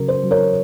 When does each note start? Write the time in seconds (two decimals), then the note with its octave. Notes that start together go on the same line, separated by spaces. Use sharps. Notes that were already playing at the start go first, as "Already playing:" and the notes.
Already playing: C#3 F#3 A#4
0.08 C5
0.23 F#3
0.31 A#4 C#5